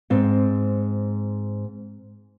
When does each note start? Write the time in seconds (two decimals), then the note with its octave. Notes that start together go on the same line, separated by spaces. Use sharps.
0.10 G#2 C4